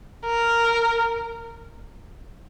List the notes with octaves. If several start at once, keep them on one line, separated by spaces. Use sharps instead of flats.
A#4